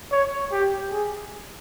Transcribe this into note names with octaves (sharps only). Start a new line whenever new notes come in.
C#5
G4
G#4